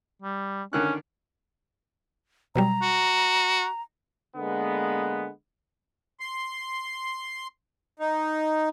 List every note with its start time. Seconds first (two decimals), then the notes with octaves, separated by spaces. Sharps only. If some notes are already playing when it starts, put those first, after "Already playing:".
0.22 G3
0.73 D3 D#3 C#4 F#6
2.56 B2 F#3 G3 A#5
2.82 F#4
4.35 D3 G#3 A#3 B3
6.20 C6
7.99 D#4